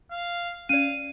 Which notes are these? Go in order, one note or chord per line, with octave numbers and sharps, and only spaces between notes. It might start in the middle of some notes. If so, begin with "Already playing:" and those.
F5
C#4 D5 F5 D#7